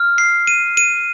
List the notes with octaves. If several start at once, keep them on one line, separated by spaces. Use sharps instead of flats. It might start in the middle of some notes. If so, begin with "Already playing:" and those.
Already playing: F6
C7
D#7
D#7